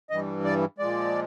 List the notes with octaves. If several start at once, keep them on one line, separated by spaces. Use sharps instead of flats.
G2 E3 G3 D#5
D5
A#2 F3 G#3 D5